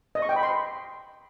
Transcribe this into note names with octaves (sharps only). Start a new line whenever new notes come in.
D#5
C#6
G5
B5
C6